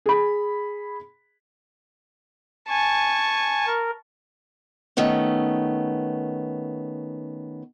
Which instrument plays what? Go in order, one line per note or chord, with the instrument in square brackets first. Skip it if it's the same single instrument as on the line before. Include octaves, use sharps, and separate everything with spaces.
[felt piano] G#4 B5
[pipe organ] G#5 [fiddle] A5 C#6
[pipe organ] A#4
[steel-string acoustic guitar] D#3 A3 B3 C#4